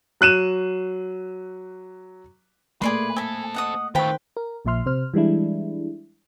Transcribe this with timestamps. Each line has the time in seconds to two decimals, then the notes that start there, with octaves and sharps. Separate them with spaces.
0.21 F#3 F#6 D#7 E7
2.82 A3 A#3 G#4 B4 D5 C6
3.16 C4 A4 G#5 B5
3.54 D#5 F#5 D#6
3.95 D#3 A3 F4 B4 C5 G5 B5
4.37 A#4
4.65 A#1 A#2 F3 E5 C6 F6
4.86 C3 C5 F6
5.14 E3 G3 G#3 D4 E4